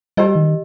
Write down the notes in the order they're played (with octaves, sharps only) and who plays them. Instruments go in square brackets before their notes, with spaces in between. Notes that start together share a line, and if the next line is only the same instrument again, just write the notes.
[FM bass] G3 [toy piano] G4 A#4 D#5
[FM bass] D#3